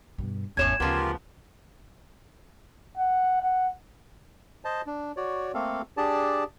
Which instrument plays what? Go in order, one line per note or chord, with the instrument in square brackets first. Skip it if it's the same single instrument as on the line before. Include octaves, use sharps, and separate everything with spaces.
[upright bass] G2 B2
[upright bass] G#1 E2 [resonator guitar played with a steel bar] A2 C#5 G#5 [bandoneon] C#4 [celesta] G#6 E7
[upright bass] D2 [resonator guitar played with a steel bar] C#3 F3 B3 [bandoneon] F4 G4 A#4
[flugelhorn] F#5
F#5
[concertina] C5 D#5 A5
D4
F#4 C#5 D5
A3 A#3 C4 A4 F5
D4 G4 G#4 D5 A5